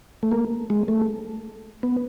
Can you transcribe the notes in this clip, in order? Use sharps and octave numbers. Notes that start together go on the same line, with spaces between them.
A3
A#3
G#3
A3
B3